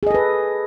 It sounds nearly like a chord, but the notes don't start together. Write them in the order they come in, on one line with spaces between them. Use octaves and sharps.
G#4 D#5 A4 B4